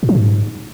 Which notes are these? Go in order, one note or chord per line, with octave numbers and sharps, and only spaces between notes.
A2
F3
G#2